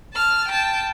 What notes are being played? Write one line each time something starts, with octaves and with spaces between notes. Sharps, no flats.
A5 F6
G5 A5